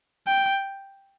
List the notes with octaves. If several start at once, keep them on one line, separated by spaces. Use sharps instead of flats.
G5